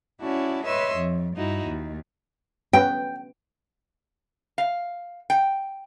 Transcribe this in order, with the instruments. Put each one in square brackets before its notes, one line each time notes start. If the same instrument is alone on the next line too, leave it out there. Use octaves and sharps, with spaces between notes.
[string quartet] C#4 E4 F#4 D5 A5
B4 C#5 D#5 E5 C6 E6
F2
G2 D#4 E4 F#4
D#2
[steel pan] B3 C#4 B4 [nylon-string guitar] G5
[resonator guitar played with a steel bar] F5
G5